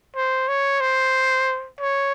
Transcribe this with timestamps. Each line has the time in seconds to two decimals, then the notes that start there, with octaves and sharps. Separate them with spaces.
0.16 C5
0.48 C#5
0.81 C5
1.80 C#5